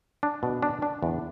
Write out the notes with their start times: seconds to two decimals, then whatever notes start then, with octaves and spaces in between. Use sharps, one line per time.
0.23 D4
0.43 B2
0.62 D4
0.82 D4
1.03 E2